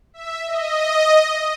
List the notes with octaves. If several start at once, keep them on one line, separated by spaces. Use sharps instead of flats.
E5
D#5